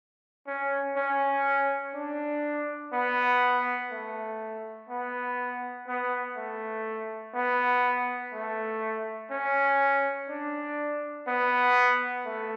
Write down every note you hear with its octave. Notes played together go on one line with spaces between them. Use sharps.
C#4
C#4
D4
B3
A3
B3
B3
A3
B3
A3
C#4
D4
B3
A3